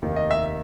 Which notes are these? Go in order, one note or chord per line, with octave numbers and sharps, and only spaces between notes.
F1 D#2 D#3
D#5
E5